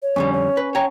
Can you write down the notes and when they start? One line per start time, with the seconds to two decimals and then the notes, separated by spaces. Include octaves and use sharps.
0.02 C#5
0.16 F2 D3 G3 C#4
0.33 C#5
0.57 B4
0.75 C#5 G5 A#5